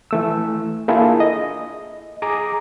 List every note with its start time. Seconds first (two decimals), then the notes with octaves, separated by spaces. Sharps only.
0.11 E3 A3 E6
0.88 A#3 D4 E4 F4 G#4 A4
1.20 D#5
2.22 G#4 A#5 D6 D#6